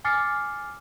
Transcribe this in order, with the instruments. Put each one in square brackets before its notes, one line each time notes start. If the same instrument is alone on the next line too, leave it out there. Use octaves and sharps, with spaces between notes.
[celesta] G#5 D6 F6 A6 C7 C#7